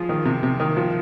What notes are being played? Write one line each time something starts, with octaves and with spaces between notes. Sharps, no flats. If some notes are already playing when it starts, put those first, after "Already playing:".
Already playing: F3 F4 G#4
D#3
C3
C3
D#3
F3